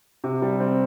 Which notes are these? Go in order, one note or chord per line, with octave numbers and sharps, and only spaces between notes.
C3
G3
C4